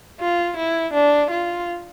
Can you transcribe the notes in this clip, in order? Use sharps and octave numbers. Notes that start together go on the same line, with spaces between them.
F4
E4
D4
F4